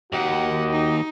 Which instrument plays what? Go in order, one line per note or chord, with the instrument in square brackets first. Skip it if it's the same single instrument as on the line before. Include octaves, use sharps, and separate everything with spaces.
[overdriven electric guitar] D#2 D#3 [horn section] F#4 G4 D#5 [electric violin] F#5
[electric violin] D#4